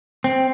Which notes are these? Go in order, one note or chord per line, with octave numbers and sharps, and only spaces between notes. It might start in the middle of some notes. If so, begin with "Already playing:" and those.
C4